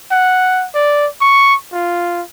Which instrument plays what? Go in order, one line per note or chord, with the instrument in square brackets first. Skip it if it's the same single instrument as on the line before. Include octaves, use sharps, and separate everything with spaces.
[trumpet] F#5
D5
C#6
F4